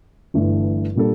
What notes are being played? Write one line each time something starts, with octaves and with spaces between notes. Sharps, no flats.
G1 G2 E3 A3
A#2 G3 A#3 D4 A4